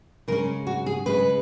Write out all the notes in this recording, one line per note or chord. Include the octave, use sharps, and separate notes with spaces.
C#3 G#3 C#4 A#4
F#4
G#4
C#3 G#3 C#4 B4